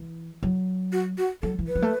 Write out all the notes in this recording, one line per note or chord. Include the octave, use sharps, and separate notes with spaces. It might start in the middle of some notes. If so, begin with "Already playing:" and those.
Already playing: E3
F#3
F#4
F#4
F#3 A4
E3
B4
F#3
A3